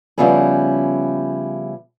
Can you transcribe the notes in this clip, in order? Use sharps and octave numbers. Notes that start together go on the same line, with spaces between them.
C#3 F3 G3 B3 E4 G#4